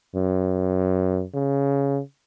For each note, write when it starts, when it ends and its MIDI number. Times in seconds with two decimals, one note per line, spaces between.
0.15 1.24 42
1.34 2.00 49